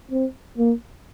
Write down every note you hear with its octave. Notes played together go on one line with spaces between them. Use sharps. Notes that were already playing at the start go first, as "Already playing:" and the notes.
C4
A#3